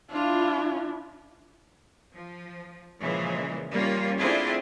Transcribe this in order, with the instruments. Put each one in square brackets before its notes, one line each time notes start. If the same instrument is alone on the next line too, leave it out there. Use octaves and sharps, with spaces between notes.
[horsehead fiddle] D4 E4 [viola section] F4
[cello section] F3
A#2 C#3 E3 F3 G#3
G3 A#3 C#4 F4
A3 C4 D4 E4 F4 G#4